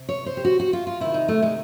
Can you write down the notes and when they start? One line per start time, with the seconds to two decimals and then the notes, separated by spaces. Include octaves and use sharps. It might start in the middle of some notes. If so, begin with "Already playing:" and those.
Already playing: C3
0.09 C#5
0.26 C5
0.37 G4
0.45 F#4
0.60 F#4
0.73 F4
0.87 F4
1.00 C3 D#3 E4
1.14 D#4
1.28 A3
1.42 G#3